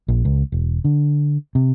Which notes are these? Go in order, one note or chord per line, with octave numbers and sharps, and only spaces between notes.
A#1
C#2
E1
D3
C3